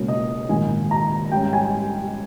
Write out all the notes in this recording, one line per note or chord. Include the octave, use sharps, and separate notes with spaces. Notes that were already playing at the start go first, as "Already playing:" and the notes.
Already playing: C#2 B2 A#3 C#4
D#5
A#1 G#2 D#3 G#5
A#5
G#2 G3 C#4 G5
G#5